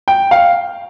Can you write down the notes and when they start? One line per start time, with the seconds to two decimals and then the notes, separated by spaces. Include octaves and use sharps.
0.08 G5
0.31 F5